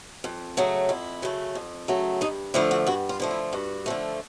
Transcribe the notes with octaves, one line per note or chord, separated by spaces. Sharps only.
F2
C#3 F#3 A3
F2 E4
C#3 F#3 A3
F2
C#3 F#3 A3
G2 D#4
D3 F3 A3 E4
F#4
G2 F#4
F4
D3 F3 A3
E4
G2 F#4
D3 F3 A3